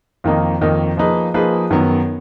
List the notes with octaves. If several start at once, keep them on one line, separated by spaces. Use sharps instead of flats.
F2 D#3 A#3 D#4
F2 D#3 A#3 D#4
F3 A#3 D#4 G#4 B4
F3 A#3 D#4 G#4 B4
F#2 D#3 F#3 B3